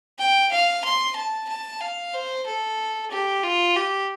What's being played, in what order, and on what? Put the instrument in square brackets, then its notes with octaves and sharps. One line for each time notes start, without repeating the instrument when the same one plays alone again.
[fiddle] G5
F5
C6
A5
A5
F5
C5
A4
G4
F4
G4